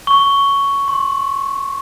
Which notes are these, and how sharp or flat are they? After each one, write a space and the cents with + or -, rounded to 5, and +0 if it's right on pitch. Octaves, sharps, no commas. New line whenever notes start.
C#6 +5
C6 +40